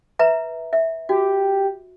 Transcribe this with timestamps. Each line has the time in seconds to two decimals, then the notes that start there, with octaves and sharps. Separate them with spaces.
0.19 B4 E5 A#5
0.73 E5
1.09 F#4 G4